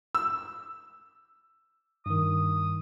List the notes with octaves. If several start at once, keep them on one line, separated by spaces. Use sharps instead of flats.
E6
G2 D#3 D#6